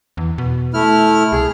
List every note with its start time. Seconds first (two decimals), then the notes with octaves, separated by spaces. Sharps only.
0.17 E2
0.38 B2
0.74 A3 E4 F6
1.32 C2 G#4